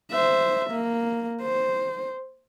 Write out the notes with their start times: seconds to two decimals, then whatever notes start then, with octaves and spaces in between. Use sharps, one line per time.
0.11 C5 E5
0.71 A#3
1.41 C5